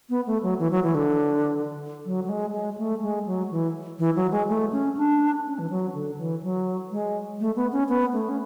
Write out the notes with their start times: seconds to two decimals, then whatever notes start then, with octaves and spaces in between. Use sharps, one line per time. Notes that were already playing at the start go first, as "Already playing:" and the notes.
0.10 B3
0.27 A3
0.43 F#3
0.59 E3
0.71 F#3
0.83 E3
0.95 D3
2.05 F#3
2.24 F#3
2.29 G#3
2.53 G#3
2.78 A3
3.02 G#3
3.26 F#3
3.51 E3
3.99 E3
4.16 F#3
4.32 G#3
4.48 A3
4.72 C#4
4.97 D4
5.45 C#4
5.59 E3
5.70 F#3
5.94 D3
6.18 E3
6.43 F#3
6.91 G#3
7.40 A3
7.56 B3
7.72 C#4
7.89 B3
8.13 A3
8.29 C#4